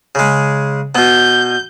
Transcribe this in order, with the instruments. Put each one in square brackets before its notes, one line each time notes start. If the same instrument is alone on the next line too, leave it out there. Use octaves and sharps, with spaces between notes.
[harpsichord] C#3 G#3
[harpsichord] B2 B3 [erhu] G6